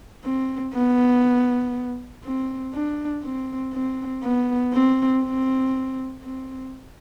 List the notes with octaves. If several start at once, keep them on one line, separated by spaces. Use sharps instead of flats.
C4
B3
C4
D4
C4
C4
B3
C4
C4
C4